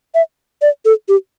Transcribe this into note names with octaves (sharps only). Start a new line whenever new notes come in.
E5
D5
A4
G4